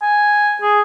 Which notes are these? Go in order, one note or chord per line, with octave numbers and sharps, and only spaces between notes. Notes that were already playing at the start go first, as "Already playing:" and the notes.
G#5
G#4